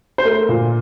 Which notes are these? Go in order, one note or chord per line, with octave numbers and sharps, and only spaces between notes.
C5
A3 A#4
A#2